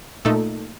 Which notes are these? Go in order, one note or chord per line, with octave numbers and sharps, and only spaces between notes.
A#2 A3 D#4 A4